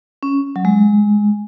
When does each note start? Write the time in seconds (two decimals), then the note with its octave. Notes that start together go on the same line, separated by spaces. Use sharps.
0.23 C#4
0.56 F#3
0.65 G#3